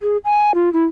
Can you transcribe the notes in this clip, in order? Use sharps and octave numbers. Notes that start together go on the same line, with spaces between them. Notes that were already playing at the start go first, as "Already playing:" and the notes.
G#4
G#5
F4
E4